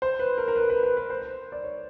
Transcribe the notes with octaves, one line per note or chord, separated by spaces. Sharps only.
C5
B4
A#4
A#4
B4
B4
B4
B4
C5
D5
C#5